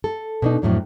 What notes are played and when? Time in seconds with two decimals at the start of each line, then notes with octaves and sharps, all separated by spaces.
0.04 A4
0.42 B2 D4 D#4
0.62 F2 A2 F#3 D4